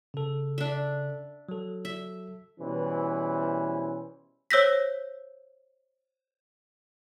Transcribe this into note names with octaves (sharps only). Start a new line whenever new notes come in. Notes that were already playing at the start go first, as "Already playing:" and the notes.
C#3 A4
D4 E5
F#3 A4
E5
B2 E3 G3 C#4 B4 C5
C5 C#5 E6 G6 A#6 B6